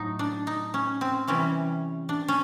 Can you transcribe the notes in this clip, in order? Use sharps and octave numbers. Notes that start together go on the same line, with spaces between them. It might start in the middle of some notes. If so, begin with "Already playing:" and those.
Already playing: A2 F#3 A3 D#4
D4
D#4
C#4
C4
C3 E3 G3 C#4
D4
C#4